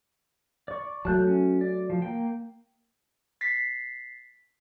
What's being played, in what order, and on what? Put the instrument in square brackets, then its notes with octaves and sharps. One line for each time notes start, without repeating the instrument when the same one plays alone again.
[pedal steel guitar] D5 C#6
[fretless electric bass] F#3 A3 [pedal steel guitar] A5 F#6 G6
[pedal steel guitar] C#4
D5
F3
A#3 G5
[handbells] A6 B6 C7